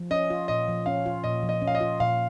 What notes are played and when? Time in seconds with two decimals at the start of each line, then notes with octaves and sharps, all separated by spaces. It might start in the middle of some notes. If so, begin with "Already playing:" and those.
Already playing: F3
0.11 C#4 D#5
0.30 F4
0.48 A#2 D#5
0.68 F3
0.86 C#4 F5
1.06 F4
1.24 A#2 D#5
1.43 F3
1.49 D#5
1.62 C#4
1.67 F5
1.75 D#5
1.81 F4
2.00 A#2 F5